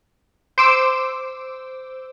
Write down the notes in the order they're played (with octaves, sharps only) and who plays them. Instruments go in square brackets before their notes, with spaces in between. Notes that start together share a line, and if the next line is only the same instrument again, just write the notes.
[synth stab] C5 D6 E6